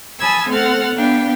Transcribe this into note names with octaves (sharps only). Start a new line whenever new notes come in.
G#5 A5 B5 D#6 E6 G#6
A3 C4 A4 F#5 F6 A6
B3 D4 F5 G5